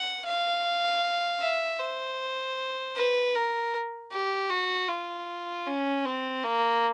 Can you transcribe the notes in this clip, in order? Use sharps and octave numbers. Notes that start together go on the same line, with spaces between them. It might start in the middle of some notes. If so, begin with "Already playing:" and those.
Already playing: F#5
F5
E5
C5
B4
A#4
G4
F#4
F4
C#4
C4
A#3